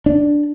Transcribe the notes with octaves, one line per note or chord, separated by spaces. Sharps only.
D4